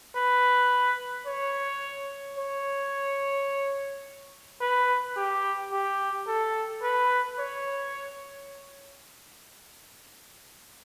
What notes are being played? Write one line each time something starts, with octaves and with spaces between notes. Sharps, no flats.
B4
C#5
C#5
B4
G4
G4
A4
B4
C#5